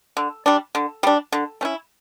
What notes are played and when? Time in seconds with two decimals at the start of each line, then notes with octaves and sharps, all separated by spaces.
0.17 D3
0.46 G3 D4
0.75 D3
1.03 G3 D4
1.32 D3
1.61 A3 C#4 E4